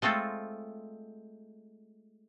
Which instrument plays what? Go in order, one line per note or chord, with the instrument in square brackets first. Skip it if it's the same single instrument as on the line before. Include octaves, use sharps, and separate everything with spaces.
[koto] G#3 A3 C4 F4 A4